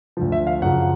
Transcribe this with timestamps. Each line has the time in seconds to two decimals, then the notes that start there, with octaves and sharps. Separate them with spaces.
0.17 D2 D3 F3
0.32 E5
0.47 F5
0.62 F#2 C#3 F3 F#5